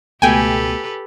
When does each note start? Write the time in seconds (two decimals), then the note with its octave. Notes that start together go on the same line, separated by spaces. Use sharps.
0.22 C#2 B2 A3 G4 A4 B4 G5 G#5